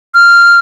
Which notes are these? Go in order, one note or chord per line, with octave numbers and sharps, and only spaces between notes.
F6